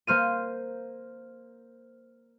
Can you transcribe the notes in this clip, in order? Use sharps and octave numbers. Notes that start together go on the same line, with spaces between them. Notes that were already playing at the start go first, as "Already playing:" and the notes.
A#3 C5 F6 D#7